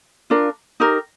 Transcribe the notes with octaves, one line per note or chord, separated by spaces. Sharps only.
D4 F4 A#4
D#4 G4 A#4